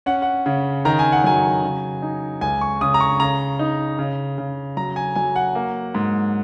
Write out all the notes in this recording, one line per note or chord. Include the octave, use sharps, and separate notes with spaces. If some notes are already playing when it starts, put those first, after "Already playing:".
C#4 F#5
F#5
C#3
D#3 A#5
G#5
F#5
F#3 G#5
C#3
D#4
C#2 G#5
C#6
C#3 D#6
A#5
C#6
C#3 A#5
D#4
C#3
C#3
F#3 A#5
G#5
F#3 G#5
F#5
A#3
G#2